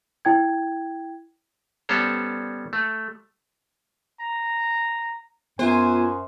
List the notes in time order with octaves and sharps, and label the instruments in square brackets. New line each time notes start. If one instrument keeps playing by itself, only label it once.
[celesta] E4 G5 G#6
[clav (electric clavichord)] G3 B3 C#4 A4 C5 C#5
A3
[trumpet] A#5
[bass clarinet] F#2 [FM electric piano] B3 F4 [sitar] C5 [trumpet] G#5